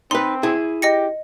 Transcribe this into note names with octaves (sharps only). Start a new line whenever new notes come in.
C4 D#4 B4 C6
E4 G#4
G4 D#5 A#6 C#7